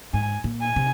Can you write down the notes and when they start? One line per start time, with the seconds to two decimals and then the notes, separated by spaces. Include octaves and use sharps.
0.14 G#2 G#5
0.44 A#2
0.61 G#5
0.76 C3